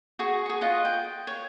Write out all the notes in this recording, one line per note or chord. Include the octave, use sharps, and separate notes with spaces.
F#4 G#4 C#6
G#4 C#6
F4 D#5 F#5
G5
C#5